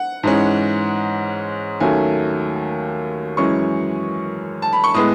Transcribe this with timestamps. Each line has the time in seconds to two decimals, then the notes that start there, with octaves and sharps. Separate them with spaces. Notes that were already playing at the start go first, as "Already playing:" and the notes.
Already playing: F#5
0.23 G#2 E3 G#3 C#4
1.80 D#2 D#3 F#3 A3 C#4 G#5
3.37 F#2 E3 G#3 C#4 C#6
4.62 A5
4.73 B5
4.84 C#6
4.94 A2 G#3 B3 D#6